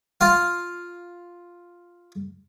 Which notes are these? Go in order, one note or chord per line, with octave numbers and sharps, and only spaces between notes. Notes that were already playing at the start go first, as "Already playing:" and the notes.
F4 F5